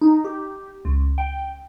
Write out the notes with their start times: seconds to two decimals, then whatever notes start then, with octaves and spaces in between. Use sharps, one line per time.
0.01 D#4
0.25 G4
0.85 C#2
1.18 G5